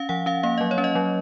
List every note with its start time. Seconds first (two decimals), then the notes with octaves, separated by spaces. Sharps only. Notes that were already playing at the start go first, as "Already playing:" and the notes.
Already playing: C#4 F5
0.09 F3 F#5
0.26 C#4 F5
0.43 A#3 F5
0.58 F#3 D#5
0.71 C#5
0.78 C#4
0.84 D#5
0.95 F#3